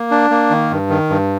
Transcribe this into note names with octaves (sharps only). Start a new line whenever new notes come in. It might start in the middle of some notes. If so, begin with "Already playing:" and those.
Already playing: A#3
D4
A#3
D#3
G2
D#3
G2